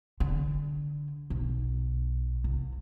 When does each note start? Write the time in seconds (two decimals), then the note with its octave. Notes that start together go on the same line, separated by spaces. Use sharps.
0.20 D3
1.30 B1
2.44 C2